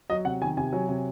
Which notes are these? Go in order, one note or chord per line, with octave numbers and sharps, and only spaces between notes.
F#3 D#5
C3 F#5
D#3 G#5
C3 G#5
F#3
C3